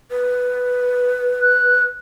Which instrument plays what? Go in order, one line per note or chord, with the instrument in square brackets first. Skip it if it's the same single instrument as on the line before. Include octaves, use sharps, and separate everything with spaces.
[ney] B4
[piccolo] F#6